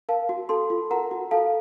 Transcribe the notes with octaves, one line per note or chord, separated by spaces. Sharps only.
A#4 F5 A5
F#4
A4 A5 C6
F4
A#4 F#5 A#5
F#4
A4 F5 A5